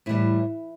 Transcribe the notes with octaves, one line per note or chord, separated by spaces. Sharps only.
A2 E3 G3 E4